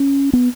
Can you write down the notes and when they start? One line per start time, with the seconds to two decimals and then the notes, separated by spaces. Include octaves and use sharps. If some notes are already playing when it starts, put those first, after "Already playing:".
Already playing: C#4
0.33 B3